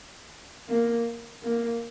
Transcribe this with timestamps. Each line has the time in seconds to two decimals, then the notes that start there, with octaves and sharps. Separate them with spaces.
0.68 A#3
1.43 A#3